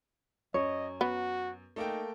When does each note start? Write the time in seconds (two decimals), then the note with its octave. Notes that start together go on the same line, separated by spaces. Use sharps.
0.54 F#2 C#5 D#5
1.01 B3 F#4
1.76 A3 A#3 D#4 G5